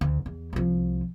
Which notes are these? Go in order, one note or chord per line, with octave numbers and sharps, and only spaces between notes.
D2
E2
C2 F3